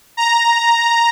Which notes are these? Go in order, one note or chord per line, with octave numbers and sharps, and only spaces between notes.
A#5